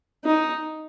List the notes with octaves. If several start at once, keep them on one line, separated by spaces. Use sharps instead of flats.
D#4